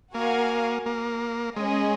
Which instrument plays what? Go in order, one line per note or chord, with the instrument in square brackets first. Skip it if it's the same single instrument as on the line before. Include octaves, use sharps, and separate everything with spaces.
[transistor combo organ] A#3 [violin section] F#4 A#4 F5 G#5
[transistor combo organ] A#3
[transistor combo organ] G#3 [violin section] C#4 G#4 D#5